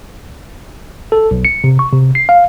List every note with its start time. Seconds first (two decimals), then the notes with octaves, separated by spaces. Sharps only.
1.12 A4
1.31 B1
1.45 C#7
1.64 C3
1.79 C#6
1.93 C3
2.15 C7
2.29 F5